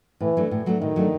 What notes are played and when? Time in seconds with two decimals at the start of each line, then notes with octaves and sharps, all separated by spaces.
0.20 A2 E3
0.37 F#3 A3 D4
0.51 A2
0.66 F#3 A3 D4
0.81 A2 D#3
0.96 F#3 A3 D4